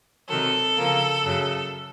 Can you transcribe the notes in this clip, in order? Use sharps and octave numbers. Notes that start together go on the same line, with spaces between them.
C3 D#3 F#3 A4
C#3 F3 A#3
F#2 C#3 F#3